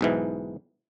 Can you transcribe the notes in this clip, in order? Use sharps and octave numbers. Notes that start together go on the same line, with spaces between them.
B1 G#2 E3